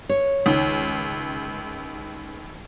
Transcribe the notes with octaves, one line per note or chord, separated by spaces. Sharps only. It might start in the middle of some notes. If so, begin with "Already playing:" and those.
C#5
C#2 D#3